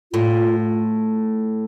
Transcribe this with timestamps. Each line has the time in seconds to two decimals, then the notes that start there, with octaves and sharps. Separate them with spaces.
0.13 A2 F4